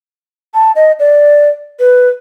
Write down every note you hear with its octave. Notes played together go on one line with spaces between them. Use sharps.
A5
D#5
D5
B4